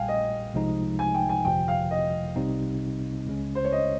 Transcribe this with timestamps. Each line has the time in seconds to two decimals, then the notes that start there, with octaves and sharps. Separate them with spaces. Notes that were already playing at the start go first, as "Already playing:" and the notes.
Already playing: A#1 A#2 G3 F5 G5 G#5
0.08 D#5
0.54 C2 C3 F3 G#3 D#4
0.99 G#5
1.15 G5
1.29 G#5
1.45 G1 F2 C3 F3 G5
1.68 F5
1.91 D#5
2.36 C2 C3 G3 C4 D#4
3.27 C#2 C#3 G#3 C#4
3.55 C5
3.64 C#5
3.72 D#5